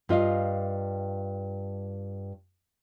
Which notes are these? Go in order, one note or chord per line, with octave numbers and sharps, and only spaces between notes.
G2 F4 D#5 F5